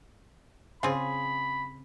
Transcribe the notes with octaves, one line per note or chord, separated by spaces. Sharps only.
C#3 C4 F4 G#4 B5